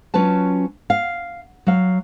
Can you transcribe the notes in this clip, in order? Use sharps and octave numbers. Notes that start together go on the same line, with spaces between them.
F#3 C#4 F4 B4 A5
F5
F#3 F5